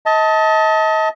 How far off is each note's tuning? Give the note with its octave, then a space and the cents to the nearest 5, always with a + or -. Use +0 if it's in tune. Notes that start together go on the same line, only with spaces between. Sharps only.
D#5 +35 A5 +5